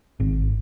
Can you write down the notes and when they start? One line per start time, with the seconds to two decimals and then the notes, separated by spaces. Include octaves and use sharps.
0.20 G#1